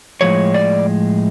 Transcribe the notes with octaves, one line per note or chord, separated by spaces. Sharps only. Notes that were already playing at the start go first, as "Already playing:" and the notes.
A2 F3 G#3 C#5
D5